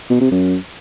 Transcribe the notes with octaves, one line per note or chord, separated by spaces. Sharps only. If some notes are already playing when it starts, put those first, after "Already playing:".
B2
C3
F#2